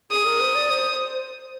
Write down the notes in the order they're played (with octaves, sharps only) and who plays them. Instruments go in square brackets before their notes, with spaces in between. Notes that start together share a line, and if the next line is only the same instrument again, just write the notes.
[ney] G#4 [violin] D#6
[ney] A#4
C5
D5
C5